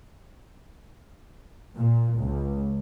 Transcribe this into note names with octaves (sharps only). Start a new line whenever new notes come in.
A#2
C#2